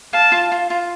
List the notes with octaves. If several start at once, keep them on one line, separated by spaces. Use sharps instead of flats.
F5 A5
F4
F4
F4